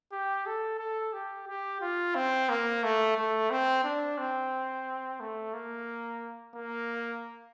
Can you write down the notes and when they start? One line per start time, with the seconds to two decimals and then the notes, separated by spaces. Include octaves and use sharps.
0.12 G4
0.47 A4
0.79 A4
1.13 G4
1.48 G4
1.81 F4
2.15 C4
2.49 A#3
2.84 A3
3.17 A3
3.51 C4
3.84 D4
4.18 C4
5.20 A3
5.54 A#3
6.55 A#3